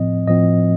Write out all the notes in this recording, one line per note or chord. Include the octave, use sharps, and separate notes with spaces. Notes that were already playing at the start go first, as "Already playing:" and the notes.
Already playing: A2 F3 C4 D#5
A2 F3 C4 D#5